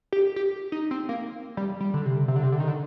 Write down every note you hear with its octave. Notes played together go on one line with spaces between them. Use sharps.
G4
G4
D#4
C4
A#3
G3
G3
D3
C3
C3
D3
C3
D3
D#3
D3